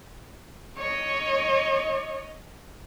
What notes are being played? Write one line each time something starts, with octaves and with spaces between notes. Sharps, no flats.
C#5 D#5